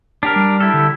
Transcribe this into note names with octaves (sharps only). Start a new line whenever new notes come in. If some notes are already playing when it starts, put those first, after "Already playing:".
D4 G4 A#4
G3
E4 G4 A4
D3